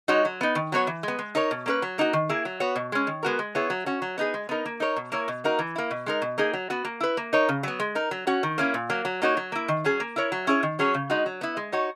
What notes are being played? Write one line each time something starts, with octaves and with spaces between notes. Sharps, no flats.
G#3 D#4 F#4 C#5
F#3
B3 D#4
D#3
F#3 B3 F#4 C#5
E3
G#3 B3
G#3
D#4 A#4 C#5
B2
A#3 C#4 G#4 B4
F#3
A#3 D#4 F#4
D#3
A#3 E4 G#4
F#3
B3 F#4 C#5
B2
G#3 C#4
D#3
G#3 B3 F#4 A#4
G#3
B3 E4 G#4 C#5
F#3
C#4 F#4
F#3
B3 D#4 G#4
G#3
B3 D#4 A#4
A#3
D#4 A#4 C#5
B2
A#3 E4 A#4 C#5
B2
A#3 D#4 F#4 A#4
E3
A#3 E4
B2
G#3 D#4 A#4
B2
A#3 D#4 G#4
F#3
B3 F#4
A#3
E4 B4
A#3
D#4 A#4 C#5
C#3
F#3 B3
G#3
D#4 A#4
F#3
C#4 F#4
D#3
A#3 C#4 E4
A#2
F#3 A#3
F#3
A#3 D#4 F#4 C#5
F#3
A#3 E4
D#3
F#3 C#4 G#4
A#3
E4 A#4 C#5
F#3
C#4 E4 G#4 C#5
D#3
F#3 C#4 G#4 C#5
C#3
G#3 D#4 F#4
F#3
B3 E4
G#3
D#4 F#4 C#5